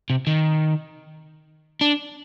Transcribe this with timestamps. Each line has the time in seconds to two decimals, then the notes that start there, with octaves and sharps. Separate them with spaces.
0.10 C3
0.27 D#3
1.81 D4